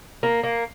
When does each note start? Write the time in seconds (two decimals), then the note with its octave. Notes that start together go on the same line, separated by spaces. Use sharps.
0.23 A#3
0.43 A#3